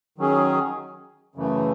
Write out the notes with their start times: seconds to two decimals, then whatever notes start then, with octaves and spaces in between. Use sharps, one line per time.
0.18 D#3 F#3 C#4 G#4
1.35 F#2 C#3 E3 A3